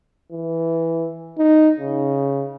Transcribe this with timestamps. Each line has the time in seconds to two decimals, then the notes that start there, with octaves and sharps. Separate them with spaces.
0.32 E3
1.38 D#4
1.80 C#3